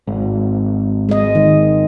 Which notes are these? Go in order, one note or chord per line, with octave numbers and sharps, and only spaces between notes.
G#1
G#3 D#5
D#3